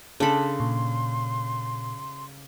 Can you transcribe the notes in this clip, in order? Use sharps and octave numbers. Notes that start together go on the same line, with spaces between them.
C#3 D4 G#4 A4 B5 C6
A#2